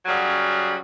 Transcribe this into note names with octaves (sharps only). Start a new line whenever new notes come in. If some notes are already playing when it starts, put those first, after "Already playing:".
F#2 C#3 F#3 G3